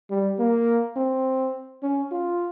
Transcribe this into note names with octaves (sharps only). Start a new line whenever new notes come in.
G3
A#3
C4
C#4
F4